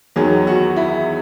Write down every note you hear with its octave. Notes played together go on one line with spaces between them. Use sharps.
E2 D#3 F#3 G#4
F#4
E4